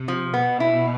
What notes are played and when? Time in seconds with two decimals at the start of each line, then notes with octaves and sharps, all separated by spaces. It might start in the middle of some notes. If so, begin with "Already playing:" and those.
Already playing: C3
0.08 F3
0.34 B2 B3
0.60 E4